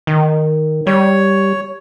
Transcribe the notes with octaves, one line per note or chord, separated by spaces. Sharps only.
D#3
G3 C#5